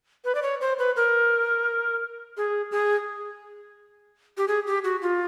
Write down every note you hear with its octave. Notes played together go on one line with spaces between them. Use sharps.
B4
D5
C#5
C5
B4
A#4
G#4
G#4
G4
G#4
G4
F#4
F4